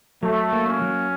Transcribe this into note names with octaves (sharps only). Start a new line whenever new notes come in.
F#3 A3
A#3
C#4
F#3